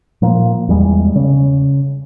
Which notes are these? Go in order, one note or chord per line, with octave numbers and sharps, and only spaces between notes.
A#2 F3 A#3
E2 G3 G#3
C#3